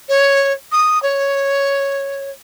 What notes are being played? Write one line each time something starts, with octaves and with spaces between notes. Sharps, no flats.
C#5
D#6
C#5